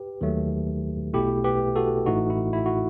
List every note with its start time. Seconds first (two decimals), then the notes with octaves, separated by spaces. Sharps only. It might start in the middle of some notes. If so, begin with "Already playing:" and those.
Already playing: G4 B4
0.21 D#2 D#3 F#3 A3
1.13 B1 B2 A3 E4 G4
1.44 G4 B4
1.76 F#4 A4
2.06 A1 A2 E3 A3 D#4 F#4
2.30 E4
2.53 E4
2.66 F#4